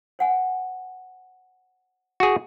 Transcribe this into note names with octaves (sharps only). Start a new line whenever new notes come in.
C5 F#5 G#5
F#4 G#4